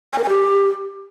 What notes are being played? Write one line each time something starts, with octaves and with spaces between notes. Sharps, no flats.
G#5
A#4
G#5
G4